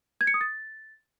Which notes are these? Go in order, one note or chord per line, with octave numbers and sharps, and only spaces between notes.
G#6
C#7
D#6
A6